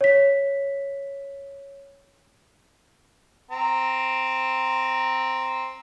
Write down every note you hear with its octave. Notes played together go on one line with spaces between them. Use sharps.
C#5 B6
C4 A#5